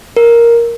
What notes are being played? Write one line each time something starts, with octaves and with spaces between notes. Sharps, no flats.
A#4